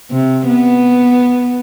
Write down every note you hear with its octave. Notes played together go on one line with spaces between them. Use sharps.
C3
B3